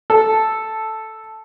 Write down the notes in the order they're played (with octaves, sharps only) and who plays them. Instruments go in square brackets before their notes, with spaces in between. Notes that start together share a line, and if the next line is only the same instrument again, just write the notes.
[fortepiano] A4